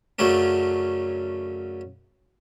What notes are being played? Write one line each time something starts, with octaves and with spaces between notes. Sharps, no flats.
F#2 C#3 F#3 A3 C#4 D4